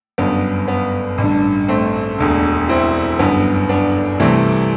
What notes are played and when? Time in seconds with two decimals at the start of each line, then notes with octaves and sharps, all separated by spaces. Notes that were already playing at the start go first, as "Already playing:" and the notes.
0.18 G1 F#2 D3 B3
0.68 B3
1.18 A1 G2 D3
1.68 A3 C4
2.18 E1 D2 D3
2.69 C4 E4
3.19 G1 F#2 D3 B3
3.69 B3 D4
4.20 C2 C3 E3 A3 C4